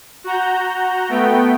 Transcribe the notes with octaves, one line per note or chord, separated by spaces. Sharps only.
F#4 A#5 G6
A3 B3 G5